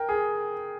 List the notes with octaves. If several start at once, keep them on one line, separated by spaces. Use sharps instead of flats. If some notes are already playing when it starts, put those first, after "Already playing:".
Already playing: A#4 G5
G#4